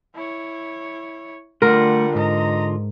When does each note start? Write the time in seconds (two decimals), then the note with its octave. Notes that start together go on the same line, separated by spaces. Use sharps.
0.15 E4 C#5
1.62 D3 G3 A3 F4 A#4 F#5
2.15 G#2 D#5 A#5